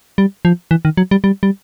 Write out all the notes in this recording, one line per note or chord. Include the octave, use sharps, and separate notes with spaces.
G3
F3
E3
D#3
F#3
G3
G3
G3